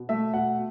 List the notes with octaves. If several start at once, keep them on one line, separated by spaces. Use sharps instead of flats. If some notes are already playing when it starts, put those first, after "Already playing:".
Already playing: B2
A3 E5
B2 F#5